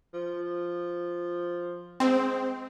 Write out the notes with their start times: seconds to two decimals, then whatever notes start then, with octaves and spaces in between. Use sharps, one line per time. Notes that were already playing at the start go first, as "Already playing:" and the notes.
0.14 F3
2.00 G#3 C4